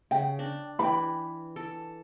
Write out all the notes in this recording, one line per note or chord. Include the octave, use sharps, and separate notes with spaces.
C#3 G5
D4
E3 G5 B5
A4